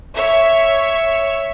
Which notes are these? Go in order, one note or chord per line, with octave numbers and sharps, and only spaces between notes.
C#5 E5